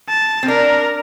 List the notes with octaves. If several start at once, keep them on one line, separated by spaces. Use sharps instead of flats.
A5
C4
D4 A#4